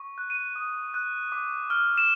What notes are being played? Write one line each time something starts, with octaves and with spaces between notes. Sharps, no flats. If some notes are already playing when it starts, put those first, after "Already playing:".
Already playing: C#6
F#6
D#7
D#6
F#6
D6
F6
E7